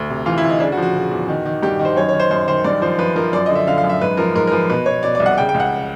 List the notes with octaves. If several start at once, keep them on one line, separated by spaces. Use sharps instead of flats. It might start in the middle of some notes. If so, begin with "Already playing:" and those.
Already playing: D2
C3
E3 F4
E4
D2
D#4
C#3 D4
F#4
F3
F#4
C#3
E2
D#3
D#3
G2 G4
D#3
C5
F#2 C#5
C#5
D#3
C5
F#2 C5
D#3 C5
G2 D5
F3 C5
F3 B4
F3 A#4
F#2 D5
D3 D#5
E5
D3 F5
F5
F#2
E5
G#2 B4
F3 A#4
G#2 A#4
A#4
F3 B4
B2 B4
B2 C#5
B2 D5
D5
C2
F#5
C#3 G5
G5
C#2
F#5